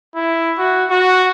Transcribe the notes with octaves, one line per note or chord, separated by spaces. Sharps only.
E4
F#4
F#4